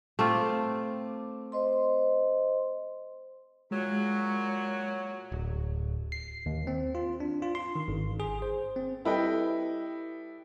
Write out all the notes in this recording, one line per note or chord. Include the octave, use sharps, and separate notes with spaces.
A3 C4 F4 D6
C5 D#5 C6
A#2 F#3 G#3
D1
C7
D#2
C4
F4
D4
F4
C6
D#3
G#1
G#4
C5
C4
G3 E4 A4 B4 D#5 G5